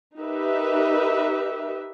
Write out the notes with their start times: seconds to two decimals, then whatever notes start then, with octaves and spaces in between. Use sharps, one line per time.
0.18 D#4 G4 A#4 B4 E5